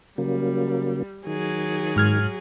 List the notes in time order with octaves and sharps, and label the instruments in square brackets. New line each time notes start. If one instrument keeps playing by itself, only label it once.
[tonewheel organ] C#3 F#3 A#3 [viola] G3
[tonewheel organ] D#3 [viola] F#3 G#4
[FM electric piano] G#2 F6 G#6